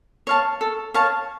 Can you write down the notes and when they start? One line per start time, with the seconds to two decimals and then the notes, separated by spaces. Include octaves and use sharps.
0.27 C#5 F5 A5
0.61 A4
0.94 C#5 F5 A5